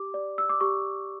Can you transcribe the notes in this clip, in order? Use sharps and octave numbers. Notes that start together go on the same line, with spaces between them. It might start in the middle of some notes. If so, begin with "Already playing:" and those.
Already playing: G4 D6
D5
E6
D6
G4 C#6